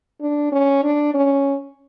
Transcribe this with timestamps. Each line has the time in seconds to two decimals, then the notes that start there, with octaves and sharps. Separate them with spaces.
0.21 D4
0.52 C#4
0.83 D4
1.14 C#4